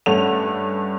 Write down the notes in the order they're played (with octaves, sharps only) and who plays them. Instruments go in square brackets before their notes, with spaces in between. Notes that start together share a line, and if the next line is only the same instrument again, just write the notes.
[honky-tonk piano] G2 A3 C#4 A4 F#5 F7